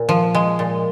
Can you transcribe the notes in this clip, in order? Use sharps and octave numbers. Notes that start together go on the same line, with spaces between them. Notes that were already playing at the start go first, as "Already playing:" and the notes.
Already playing: A#2
F3
G#3
A#2